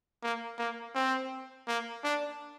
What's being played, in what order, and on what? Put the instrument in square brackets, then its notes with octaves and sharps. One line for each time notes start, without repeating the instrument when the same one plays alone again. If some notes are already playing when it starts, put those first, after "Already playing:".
[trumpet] A#3
A#3
C4
A#3
D4